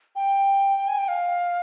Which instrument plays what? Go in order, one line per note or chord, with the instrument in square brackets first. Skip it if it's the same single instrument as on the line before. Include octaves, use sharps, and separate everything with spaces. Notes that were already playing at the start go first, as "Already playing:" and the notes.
[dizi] G5
G#5
G5
F5